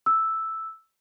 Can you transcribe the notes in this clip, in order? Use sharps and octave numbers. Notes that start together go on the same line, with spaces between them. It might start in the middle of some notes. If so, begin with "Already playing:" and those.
E6